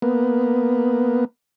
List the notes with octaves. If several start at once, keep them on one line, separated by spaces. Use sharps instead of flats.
A#3 B3